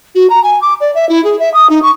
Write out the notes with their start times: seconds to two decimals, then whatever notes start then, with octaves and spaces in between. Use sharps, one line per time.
0.14 F#4
0.29 A#5
0.43 G#5
0.61 D6
0.80 D5
0.94 E5
1.09 E4
1.24 G#4
1.39 E5
1.53 D#6
1.69 D#4
1.82 C#6